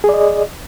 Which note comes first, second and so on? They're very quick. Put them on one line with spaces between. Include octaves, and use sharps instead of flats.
G#4 D5 D#5